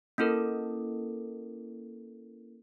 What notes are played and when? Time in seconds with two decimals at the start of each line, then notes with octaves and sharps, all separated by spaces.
0.18 A#3 C#4 E4 A4 A#4